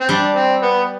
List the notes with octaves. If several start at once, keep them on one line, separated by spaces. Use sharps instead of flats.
C4
G3 D4
C4
B3